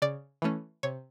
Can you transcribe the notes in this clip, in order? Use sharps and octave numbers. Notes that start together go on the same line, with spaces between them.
C#3 D5
E3 A3 C#4
C3 C#5